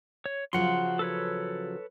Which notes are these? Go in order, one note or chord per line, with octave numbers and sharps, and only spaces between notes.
C#5
C#3 F3 F#3 F#5 C6
A4 B4 C#5